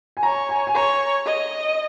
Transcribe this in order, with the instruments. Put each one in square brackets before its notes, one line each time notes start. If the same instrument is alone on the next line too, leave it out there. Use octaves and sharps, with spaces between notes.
[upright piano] G#5
[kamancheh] C#5 [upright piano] A#5
[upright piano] G#5
G#5
[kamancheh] C#5 [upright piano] A#5
[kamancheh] D#5